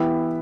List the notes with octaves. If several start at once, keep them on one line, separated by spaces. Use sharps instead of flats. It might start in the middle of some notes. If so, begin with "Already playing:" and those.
Already playing: E3 B3 E4 G4